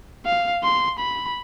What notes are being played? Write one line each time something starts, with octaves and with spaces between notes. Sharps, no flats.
F5
C6
B5